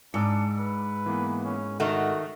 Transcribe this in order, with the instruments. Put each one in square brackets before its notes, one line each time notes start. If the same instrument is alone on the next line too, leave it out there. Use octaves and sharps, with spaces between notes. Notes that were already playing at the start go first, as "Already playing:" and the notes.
[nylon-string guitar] G#2 [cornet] D4 [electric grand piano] D6 E6 C#7
[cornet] B4
[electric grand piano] E3 A#3 B3
[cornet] C#4
[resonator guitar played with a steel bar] D#3 A3 [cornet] F#4 [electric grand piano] F#5